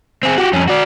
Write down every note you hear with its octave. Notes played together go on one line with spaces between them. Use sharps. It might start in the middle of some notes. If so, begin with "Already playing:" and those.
C4 G#4
F#4 G4
F2 C#4
F#4 D5